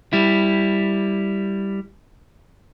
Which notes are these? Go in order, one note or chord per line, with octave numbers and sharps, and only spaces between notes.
G3 E4